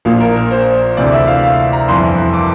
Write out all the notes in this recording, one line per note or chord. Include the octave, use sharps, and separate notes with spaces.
A#1 A#2 F3 F5
A#4
A#4
C5
D2 C3 E3 D5
E5
F5
F5
A#5
G1 F2 E3 C6
D6